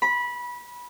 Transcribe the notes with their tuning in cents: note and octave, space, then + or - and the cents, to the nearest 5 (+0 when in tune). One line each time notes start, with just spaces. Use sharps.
B5 -20